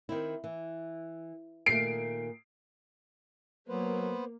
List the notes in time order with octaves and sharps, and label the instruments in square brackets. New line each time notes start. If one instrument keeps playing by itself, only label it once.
[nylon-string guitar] D#3 C4 E4
E3
[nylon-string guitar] A#2 D#3 A3 [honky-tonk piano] C7 D7
[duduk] F#3 [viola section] A#3 [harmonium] B3 B4 C5